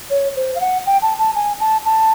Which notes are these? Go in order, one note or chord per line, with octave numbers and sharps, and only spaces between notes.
C#5
C5
F5
F#5
G5
A5
A5
G#5
A5
A5